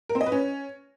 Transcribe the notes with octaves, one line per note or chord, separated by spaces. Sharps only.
A#4
C4
D#5
B4
C#4